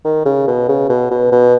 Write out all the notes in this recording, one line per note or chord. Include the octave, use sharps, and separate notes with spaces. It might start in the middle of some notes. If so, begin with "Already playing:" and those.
D#3
C#3
B2
C#3
B2
B2
B2